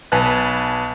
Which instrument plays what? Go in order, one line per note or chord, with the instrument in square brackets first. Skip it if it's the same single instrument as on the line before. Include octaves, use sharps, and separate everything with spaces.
[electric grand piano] B1 B4 G#5 A5 F#6